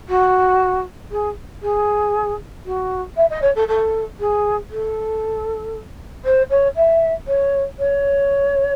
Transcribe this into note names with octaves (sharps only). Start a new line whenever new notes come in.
F#4
G#4
G#4
F#4
E5
D#5
C#5
A4
A4
G#4
A4
C5
C#5
E5
C#5
C#5